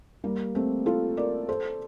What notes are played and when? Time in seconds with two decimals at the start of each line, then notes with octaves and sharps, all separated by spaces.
0.24 G3 A#3
0.55 A3 C4
0.86 F4 A4
1.17 A#4 D5
1.49 A4 C5